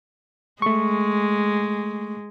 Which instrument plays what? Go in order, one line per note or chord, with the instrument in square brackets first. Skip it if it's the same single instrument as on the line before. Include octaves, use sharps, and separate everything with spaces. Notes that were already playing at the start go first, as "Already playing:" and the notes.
[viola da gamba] G#3 [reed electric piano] A3 C#6